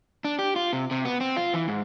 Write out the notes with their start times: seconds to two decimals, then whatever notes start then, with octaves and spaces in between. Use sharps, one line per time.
0.25 D4
0.39 G4
0.56 F4
0.73 C3
0.91 C3
1.05 B3
1.21 C4
1.36 F4
1.54 E3
1.68 G#2